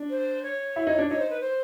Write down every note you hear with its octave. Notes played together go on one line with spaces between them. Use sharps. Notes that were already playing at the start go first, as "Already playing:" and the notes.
Already playing: D4
C5
C#5
E4
D#4
D4
D#4 C#5
C5
B4
C5